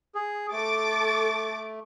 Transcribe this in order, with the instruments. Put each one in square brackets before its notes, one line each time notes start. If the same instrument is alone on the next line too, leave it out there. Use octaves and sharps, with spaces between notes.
[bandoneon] G#4
[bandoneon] A3 [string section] A4 D6 A6